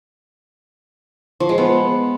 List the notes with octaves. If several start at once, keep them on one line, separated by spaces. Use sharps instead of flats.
F3
G#3
B3